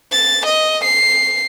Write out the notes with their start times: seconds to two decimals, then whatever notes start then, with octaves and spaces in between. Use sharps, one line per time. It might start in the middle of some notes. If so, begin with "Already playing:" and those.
0.12 A6
0.46 D#5
0.85 C7